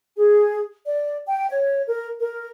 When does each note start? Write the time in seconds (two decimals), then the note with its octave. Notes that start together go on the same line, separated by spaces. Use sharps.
0.16 G#4
0.85 D5
1.26 G5
1.50 C#5
1.87 A#4
2.19 A#4